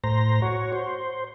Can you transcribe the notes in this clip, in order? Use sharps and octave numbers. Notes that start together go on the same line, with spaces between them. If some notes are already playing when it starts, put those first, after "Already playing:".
A2 C5 A#5
F#4 C#5
C5